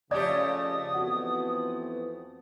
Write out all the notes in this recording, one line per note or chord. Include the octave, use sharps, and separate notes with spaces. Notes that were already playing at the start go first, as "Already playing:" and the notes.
F2 C#3 A3 G4 D5 D#5 D#6 G#6
E3 B3 C4 F#4